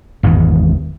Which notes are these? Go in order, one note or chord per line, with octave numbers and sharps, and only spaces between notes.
G#1 E2 G#2